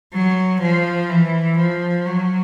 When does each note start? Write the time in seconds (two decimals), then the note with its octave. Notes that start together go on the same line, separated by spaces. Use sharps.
0.12 F#3
0.60 F3
1.09 E3
1.57 F3
2.06 F#3